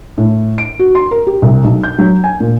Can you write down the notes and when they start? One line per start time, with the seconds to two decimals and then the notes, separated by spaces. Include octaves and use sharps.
0.18 A2
0.58 D7
0.79 F#4
0.95 C6
1.11 A#4
1.27 G4
1.42 C2
1.64 B1
1.84 G6
1.99 F#3
2.24 G#5
2.40 A#2